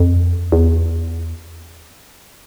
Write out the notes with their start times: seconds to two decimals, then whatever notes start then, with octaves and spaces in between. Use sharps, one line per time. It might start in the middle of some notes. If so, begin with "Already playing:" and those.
Already playing: F2
0.52 E2